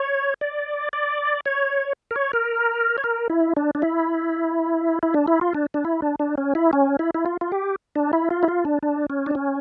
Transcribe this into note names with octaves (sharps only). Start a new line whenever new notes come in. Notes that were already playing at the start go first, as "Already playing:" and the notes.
Already playing: C#5
D5
D5
C#5
A#4
C#5
A#4
C#5
A#4
E4
D4
D4
E4
E4
D4
E4
F4
D4
D4
E4
D4
D4
C#4
E4
C#4
E4
E4
F4
F4
G4
D4
E4
F4
E4
F4
D4
D4
C#4
D4
C#4